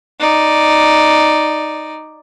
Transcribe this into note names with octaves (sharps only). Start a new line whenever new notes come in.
D#4 D5